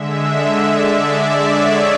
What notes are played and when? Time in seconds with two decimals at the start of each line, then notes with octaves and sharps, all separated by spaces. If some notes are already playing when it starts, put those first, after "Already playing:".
Already playing: D3 G#3 E5
0.63 D5
0.90 D5
1.20 E5
1.47 C#5